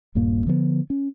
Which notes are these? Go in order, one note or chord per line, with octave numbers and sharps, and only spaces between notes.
D#1 G2 A#2 A#3
D3 F3 G#3 B3
C#4